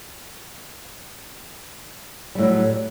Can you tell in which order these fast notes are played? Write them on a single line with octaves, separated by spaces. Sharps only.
G3 A2 F#3